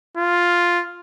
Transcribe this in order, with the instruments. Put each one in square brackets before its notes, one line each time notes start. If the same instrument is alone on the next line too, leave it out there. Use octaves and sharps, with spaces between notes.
[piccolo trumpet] F4